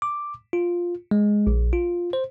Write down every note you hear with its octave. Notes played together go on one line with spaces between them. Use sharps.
D6
F4
G#3
A#1
F4
C5